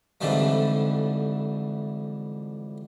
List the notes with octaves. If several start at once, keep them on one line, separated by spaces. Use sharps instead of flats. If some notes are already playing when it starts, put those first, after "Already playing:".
F2 G#2 D3 E3 G3 A3